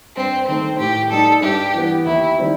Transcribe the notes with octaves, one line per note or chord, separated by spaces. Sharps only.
G2 C4
D#3 A3 C4
A2 G4
G3 D#4 A4
G2 G4
E3 B3
D#2 E4
D#3 G3 C4 E4